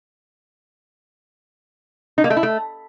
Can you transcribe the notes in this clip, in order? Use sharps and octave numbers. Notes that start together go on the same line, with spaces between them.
D#4
A#3
A3
E4
A3